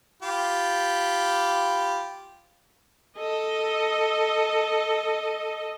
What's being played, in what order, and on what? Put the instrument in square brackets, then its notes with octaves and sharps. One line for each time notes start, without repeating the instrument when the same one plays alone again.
[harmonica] F4 G4 B5
[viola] A4 D#5